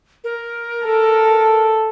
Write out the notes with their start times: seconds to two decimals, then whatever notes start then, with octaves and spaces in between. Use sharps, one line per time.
0.24 A#4
0.85 A4